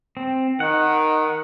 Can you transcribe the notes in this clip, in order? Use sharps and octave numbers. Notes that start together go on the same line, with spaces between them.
C4
D#3 F#5